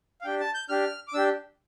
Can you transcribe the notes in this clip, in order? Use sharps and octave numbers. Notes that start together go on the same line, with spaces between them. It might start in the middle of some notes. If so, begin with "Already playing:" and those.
F5
D4 G4 G5
A5
G6
D4 G4 F6
D6
D4 G4 E6